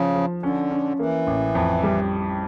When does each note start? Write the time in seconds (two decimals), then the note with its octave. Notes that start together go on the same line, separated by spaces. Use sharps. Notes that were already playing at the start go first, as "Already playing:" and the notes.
Already playing: C#3 F3
0.15 F3
0.43 D3 C#4
0.71 C#4
0.99 E3 A#3
1.27 A1
1.55 F2
1.83 G3